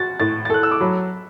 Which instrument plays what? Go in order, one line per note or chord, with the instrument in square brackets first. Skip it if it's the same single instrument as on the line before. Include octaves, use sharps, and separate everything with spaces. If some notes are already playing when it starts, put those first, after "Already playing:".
Already playing: [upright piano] F#4 [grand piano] A6
[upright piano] A2 [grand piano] A6
[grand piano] A6
[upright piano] A4 [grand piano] F#6
[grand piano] E6
D6
[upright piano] F#3 [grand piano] B5